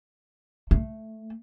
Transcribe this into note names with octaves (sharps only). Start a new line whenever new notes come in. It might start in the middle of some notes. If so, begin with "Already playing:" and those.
A3